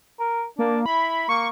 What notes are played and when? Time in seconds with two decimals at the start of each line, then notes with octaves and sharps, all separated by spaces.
0.20 A#4
0.59 A#3 D4
0.86 E4 B5
1.29 A#3 C#6